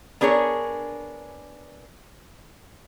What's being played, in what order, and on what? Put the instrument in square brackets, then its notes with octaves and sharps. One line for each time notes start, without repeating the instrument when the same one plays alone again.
[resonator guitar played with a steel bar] B3 D4 G#4 A#4 C#5